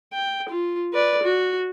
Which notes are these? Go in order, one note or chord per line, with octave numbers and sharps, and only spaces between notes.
G5
F4
B4 D5
F#4